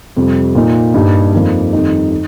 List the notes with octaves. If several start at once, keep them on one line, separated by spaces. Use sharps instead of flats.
F2 C3 G3
A#2 A#3 D#4
G2 G3 A#3 D#4
F2 F3 A#3 D#4
F2 D#3 G3 D#4
D#4